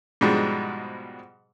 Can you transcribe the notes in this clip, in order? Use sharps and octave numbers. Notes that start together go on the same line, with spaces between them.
G#2 B2 F3 G3 G#3